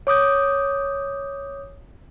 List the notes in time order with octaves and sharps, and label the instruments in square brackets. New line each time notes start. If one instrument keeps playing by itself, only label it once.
[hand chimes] C#5 D6 D#6 G6